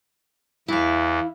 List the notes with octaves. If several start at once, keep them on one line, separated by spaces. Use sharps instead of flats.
E2 E3 E4 F5